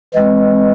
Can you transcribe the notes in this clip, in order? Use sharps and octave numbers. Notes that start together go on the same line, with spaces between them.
E3 G#3 C4